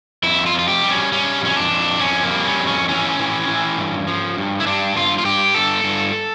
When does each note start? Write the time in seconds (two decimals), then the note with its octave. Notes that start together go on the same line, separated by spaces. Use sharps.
0.23 F2 E4
0.46 F4
0.54 F2
0.59 F4
0.68 G4
0.83 G3
0.90 C#4
1.12 G3 C#4
1.42 F2 C#4
1.56 D4
1.71 F2
2.00 F2 C#4
2.23 A#3
2.31 G3
2.46 C#4
2.60 F2
2.67 C#4
2.89 E3 C#4
3.19 E3
3.48 E3
3.78 G2
4.07 F3
4.38 G2
4.60 E4
4.67 G2 D4
4.96 G2 F4
5.18 F4
5.25 G2 G4
5.54 G2 A4
5.84 G2